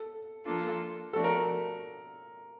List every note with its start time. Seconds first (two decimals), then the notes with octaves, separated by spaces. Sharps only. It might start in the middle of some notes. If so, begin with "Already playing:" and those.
Already playing: A4
0.45 F3 A#3 D4 F4 A4
1.13 F3 A3 D4 F#4 A4
1.24 A#4